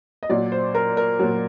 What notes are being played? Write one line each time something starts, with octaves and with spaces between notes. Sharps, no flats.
D#5
A#2 F#3 D5
C5
A#4
A#4
A#2 F#3